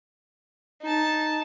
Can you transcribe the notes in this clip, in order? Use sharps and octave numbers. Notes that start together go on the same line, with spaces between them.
D#4 A5